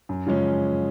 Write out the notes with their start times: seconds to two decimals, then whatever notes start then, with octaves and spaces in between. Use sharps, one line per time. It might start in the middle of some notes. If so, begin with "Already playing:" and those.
0.09 F#2
0.27 C#3 F3 G#3 C#4